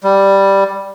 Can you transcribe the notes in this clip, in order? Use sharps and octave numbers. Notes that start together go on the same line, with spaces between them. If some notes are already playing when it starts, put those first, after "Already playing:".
G3